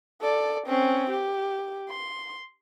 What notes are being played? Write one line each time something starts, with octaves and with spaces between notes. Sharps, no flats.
A4 D5
C4 C#4
G4
C6